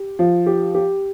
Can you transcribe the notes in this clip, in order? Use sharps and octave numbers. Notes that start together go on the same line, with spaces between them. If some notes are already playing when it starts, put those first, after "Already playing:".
Already playing: G4
F3
G4
G4